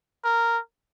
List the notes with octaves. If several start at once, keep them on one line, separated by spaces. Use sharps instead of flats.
A#4